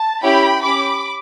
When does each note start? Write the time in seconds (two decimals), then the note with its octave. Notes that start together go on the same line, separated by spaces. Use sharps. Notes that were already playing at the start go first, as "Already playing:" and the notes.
Already playing: A5
0.23 C#4 E4 G4 G5 B5
0.64 C#4 G4 B5 D6